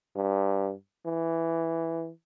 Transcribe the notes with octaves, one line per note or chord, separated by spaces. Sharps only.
G2
E3